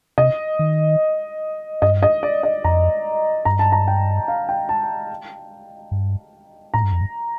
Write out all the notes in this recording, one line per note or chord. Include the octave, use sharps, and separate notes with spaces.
C3 D#5
D#3
G2 D#5
D#5
D5
D#5
F2 A#5
G2 A#5
A5
A#5
G5
F5
G5
A5
G2
A2 A#5
G2
F2
G2